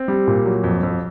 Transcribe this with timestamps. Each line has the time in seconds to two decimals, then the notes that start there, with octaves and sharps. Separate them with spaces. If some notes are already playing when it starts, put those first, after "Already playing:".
Already playing: C4
0.08 G3
0.27 A#2
0.45 F#3
0.64 F2
0.83 F2